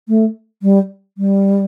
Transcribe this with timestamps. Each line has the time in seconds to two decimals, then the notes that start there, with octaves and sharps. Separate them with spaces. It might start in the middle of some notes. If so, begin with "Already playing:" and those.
0.09 A3
0.63 G3
1.18 G3